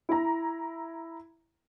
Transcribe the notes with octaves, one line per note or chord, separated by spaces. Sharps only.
E4 A#5